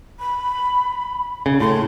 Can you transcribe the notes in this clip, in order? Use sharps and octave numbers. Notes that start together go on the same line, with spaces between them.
B5
C#3
A2 C6